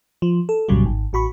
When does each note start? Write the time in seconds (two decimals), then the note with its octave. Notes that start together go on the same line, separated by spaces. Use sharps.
0.22 F3
0.49 A4
0.69 C2 G2 A#2 C#3 F#3 G3
0.86 G#1
1.13 A1 F#4 B5 C#6